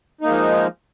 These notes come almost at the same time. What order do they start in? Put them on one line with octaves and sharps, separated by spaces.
D#4 A#3 G#3 F3